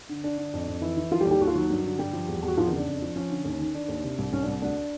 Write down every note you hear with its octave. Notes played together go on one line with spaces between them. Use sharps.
D3
D3 D4
D3
F2
F2
E3 E4
E3
D#3 F3 F4
G3 G4
D#2
G3 G4
D#2 F#4
F4
D#3 F#3 F#4
G2
D3
G2 G3 G4
F3
E2
E2
F#4
E2 F3 F4
D#3 D#4
C#3 D4
F2
F3
F3 C#4
D3
D#2
D#3
D#3 D4
D#2
C3
C2
C2 C#4
D4
C2
D2 D4